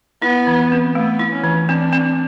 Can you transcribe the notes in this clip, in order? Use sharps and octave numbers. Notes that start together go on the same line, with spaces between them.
B3 E4
E3
C4
A3 B3
E4
C#4
E3
C4 D4
C4